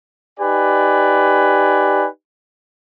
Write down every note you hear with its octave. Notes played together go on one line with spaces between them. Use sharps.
D#4 G4 B4 D5 G#5